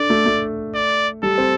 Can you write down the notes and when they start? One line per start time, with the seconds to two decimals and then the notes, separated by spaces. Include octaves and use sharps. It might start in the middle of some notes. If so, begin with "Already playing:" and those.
Already playing: D4 A4 D5
0.10 A3
0.26 A3
0.74 D5
1.23 G3 A4
1.38 C4